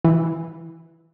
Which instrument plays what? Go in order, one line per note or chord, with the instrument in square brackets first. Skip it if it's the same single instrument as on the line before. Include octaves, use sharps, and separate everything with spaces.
[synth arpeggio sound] E3